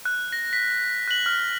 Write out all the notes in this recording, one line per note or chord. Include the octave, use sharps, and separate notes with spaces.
F#6
A#6
B6
F#6 F#7
F6